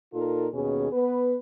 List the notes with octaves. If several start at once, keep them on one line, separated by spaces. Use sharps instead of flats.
A#2 D#4 F4 A4 A#4
D#2 B2 C#4 G#4
B3 B4